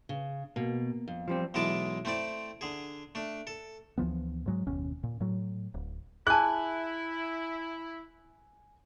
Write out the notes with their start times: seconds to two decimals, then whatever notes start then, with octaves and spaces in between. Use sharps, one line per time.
0.09 C#3
0.56 B2 A#3
1.08 F2
1.28 F3 G3 C4
1.54 B1 E3 G#3 E4 A5 D6
2.05 A3 C4 E4 D5
2.61 D3 G#4
3.15 A3 D4
3.47 A4
3.98 D2 E3 F3 B3
4.46 G#2 F#3 G#3
4.67 F#1 D#2 B2 C#4
5.03 A#2
5.21 A2 F#3
5.74 D1
6.27 E4 G#4 G#5 A5 F#6